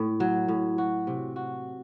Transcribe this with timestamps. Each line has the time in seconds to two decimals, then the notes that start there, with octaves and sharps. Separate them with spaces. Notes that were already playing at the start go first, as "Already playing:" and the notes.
Already playing: A2
0.20 F#3
0.48 A2
0.78 F#4
1.07 C3
1.36 F#4